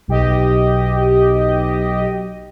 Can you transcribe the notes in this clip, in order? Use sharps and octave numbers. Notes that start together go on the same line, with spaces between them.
B1 G4 D#5